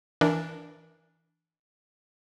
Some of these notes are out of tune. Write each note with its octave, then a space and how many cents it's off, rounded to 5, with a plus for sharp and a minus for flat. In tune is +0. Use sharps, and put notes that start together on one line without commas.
E3 -5 D4 +0 A#4 +0